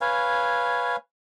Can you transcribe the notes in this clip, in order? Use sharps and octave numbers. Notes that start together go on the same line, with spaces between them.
B4 C#5 F5 G#5